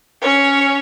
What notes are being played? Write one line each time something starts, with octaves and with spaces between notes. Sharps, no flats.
C#4 C#5